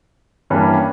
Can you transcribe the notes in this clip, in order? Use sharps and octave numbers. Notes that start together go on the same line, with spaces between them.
G2 E3 G3 A#3 C#4